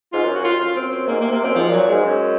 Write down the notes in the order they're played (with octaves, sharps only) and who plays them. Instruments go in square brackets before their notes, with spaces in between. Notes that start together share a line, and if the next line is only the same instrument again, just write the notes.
[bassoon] G#2 [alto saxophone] F4
[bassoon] F#2
[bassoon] F#2 [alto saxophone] F#4
[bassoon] F2 [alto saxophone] F4
[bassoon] F#2 [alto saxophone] F4
[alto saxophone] C4
C4
[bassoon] G#2 [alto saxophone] A#3
[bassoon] C3 [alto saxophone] A#3
[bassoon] C3 [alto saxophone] A#3
[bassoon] F#2 [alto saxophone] C4
[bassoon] G#2 [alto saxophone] F3
[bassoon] A#2
[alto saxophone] F#3
[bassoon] A#2
[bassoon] G#2 [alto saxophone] G#3
[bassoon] F#2